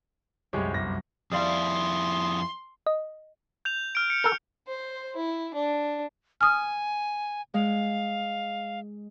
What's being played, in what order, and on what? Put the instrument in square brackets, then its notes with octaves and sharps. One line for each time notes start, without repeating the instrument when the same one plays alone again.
[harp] C2 F#2 [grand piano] G#3 G4 C#5
[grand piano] G1 A#6
[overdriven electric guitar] F2 E4 [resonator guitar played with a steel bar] G3 D5 F5 [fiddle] C6 [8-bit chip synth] D#6
[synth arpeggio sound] D#5
[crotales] G6 F7
F6 D7
C#7
[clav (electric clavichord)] A4 A#4
[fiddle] C5
E4
D4
[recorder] G#5 [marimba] D#6 F6
[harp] G#3 [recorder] F5